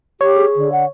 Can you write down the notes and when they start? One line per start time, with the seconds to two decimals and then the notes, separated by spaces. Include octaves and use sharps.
0.21 G4 C#5
0.35 G#4
0.56 D3
0.72 F#5